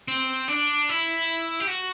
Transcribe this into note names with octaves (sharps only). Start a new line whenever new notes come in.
C4
D4
E4
G4
F#4